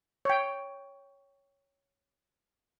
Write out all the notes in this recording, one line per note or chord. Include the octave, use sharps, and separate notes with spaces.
C#5 G5